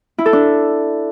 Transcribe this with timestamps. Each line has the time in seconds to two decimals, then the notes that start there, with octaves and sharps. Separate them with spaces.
0.18 E4
0.26 A4
0.33 D4